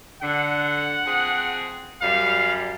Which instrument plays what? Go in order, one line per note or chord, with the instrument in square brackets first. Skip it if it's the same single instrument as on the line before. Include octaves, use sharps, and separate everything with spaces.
[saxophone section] D3 [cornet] F#5
[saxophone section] F3 C4 G#4
[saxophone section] F#2 G3 [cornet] F5